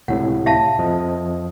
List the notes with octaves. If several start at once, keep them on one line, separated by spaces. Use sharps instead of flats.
C#2 A2 C3 F#5
E5 F5 A5
F2 F3 D#5